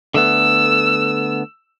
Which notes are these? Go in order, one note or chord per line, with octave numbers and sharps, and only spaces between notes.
D3 A3 B3 E6